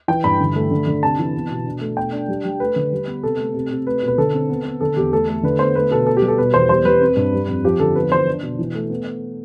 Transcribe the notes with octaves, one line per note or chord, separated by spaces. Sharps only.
E3 G5
G2 B5
D3
A3
D3
D3
C3 A5
E3
B3
B2
D4
A3
B2 G5
D4
G3
G3
A3 B4
D3
G3
B3
C3 A4
A3
C3
C3
A3 B4
B2 B4
D3 A4
C4
B3
B3
D3 A4
E2 G4
A3 A4
A3
D3 B4
B3 C5
A3 B4
B2 A4
B3 A4
G4
G3
A4
B2 B4
E2 C5
G3 C5
G3 B4
C4
G2
G3
F2
F3 G4
D3 A4
B3 B4
E3 C5
D4
B2
E3
A3
B3